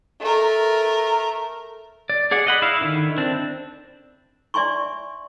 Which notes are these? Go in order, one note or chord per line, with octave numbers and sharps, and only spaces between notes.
A3 A#4
D5
G#4 D5 F#5
D#5 F#5 B5
E4 F5
D3 D#3 E4
C4 D4
D5 E5 G#5 C6 C#6